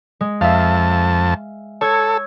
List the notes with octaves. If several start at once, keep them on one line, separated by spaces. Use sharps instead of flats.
G#3
F2 E5 F5 A5
A4 C#5 E6 G#6